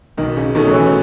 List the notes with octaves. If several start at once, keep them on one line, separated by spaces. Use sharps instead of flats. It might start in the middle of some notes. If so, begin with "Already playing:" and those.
B1 D#3
C#3
B2 D#3 A3 C#4
F#3
E3